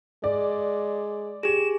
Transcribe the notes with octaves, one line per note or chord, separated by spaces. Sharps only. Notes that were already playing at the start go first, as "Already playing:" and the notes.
G#3 D5
G4 G#4 E7